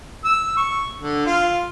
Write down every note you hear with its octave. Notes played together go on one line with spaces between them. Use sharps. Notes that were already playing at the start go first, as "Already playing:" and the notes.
E6
C#6
D3
F4